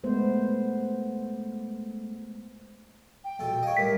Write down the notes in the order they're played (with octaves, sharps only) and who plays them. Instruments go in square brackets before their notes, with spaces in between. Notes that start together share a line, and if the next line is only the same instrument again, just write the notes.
[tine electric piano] G#3 A3 [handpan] B3 C5
[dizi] G5
[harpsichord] A#1 B2 A4
[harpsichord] C#5 D#5 [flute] F5
[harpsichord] A2 G3 [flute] A#4 [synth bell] B6